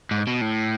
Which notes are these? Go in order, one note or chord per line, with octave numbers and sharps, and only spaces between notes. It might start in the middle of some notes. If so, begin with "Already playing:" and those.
G#2
B2
A2